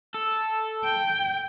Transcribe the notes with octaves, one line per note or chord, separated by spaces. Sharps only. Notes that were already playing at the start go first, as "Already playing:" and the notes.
A4
G5